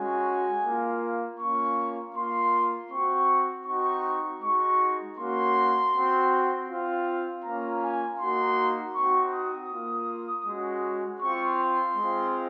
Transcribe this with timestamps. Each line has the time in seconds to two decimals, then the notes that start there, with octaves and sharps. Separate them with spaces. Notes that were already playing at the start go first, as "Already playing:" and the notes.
Already playing: G#3 C#4 F#4 G#5
0.65 A#3 F4
1.40 A#3 C#4 F4 C#6
2.15 A#3 F4 C6
2.91 C4 F#4 C#6
3.67 C4 D#4 F#4 C#6
4.42 G#3 D#4 F#4 C#6
5.18 A#3 C#4 F#4 C6
5.93 C4 F#4
6.69 C4 F4
7.44 A#3 C#4 F4 A#5
7.82 G#5
8.20 A#3 D#4 F#4 C6
8.95 C4 D#4 F#4 C#6
9.33 D#6
9.71 A#3 F4
10.46 G#3 C#4 F#4
11.21 C4 F4 C#6
11.59 C6
11.97 G#3 C4 F4